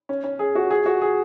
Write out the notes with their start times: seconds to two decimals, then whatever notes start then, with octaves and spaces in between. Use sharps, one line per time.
0.09 C#4
0.24 C#4
0.39 G#4
0.55 F#4
0.71 G#4
0.86 F#4
1.02 G#4